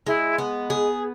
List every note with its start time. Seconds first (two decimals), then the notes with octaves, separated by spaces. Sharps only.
0.07 G#3 E4
0.38 B3
0.70 G#4